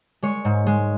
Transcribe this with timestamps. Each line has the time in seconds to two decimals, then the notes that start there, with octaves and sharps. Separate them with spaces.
0.22 G#3 C#5
0.45 G#2
0.66 G#3